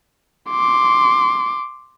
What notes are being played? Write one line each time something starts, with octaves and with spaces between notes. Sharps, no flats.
C6 D6